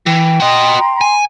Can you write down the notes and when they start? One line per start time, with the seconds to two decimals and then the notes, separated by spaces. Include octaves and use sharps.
0.06 E3 G5
0.40 F#4 D#5 A#5 C6
1.01 G#5